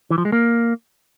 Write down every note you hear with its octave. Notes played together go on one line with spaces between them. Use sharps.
E3
F3
G#3
A#3